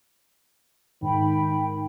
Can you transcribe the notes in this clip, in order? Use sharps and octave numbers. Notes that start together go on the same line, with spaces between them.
G#2 D#3 G5 B5